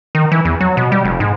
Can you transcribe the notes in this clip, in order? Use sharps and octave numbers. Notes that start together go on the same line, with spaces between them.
D#3
E3
E2
F#3
B2
G3
F1
G#2